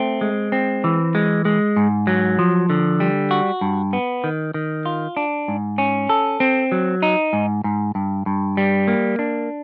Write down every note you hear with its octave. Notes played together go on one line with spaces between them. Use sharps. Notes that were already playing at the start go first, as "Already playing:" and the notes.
Already playing: A3 C4
G#3
C4
E3
G#3
G#3
G#2
F#3
F3
D3
G3
F#4
G2
B3
D#3
D#3
F4
D4
G#2
C#4
A4
C4
F#3
D#4
G#2
G#2
G2
G2
G3
A#3
D4